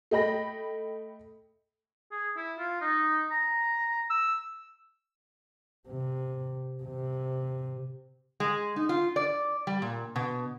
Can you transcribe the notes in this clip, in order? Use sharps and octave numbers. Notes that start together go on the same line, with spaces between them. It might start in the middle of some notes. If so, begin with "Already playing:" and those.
A3 D#5 G5 B5 A#6
G#4
E4
F4
D#4
A#5
E6
C3
C3
G#3
D#4
F4
D5
G3
A#2
B2